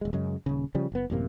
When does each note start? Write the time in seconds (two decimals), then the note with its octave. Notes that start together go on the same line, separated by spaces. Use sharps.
0.01 D#1 G#3
0.13 F#2 C#3 G#3
0.46 D#1 C#3
0.75 C#3 F3 G3
0.92 F#1 B3
1.10 A1 F#2 C3 A#3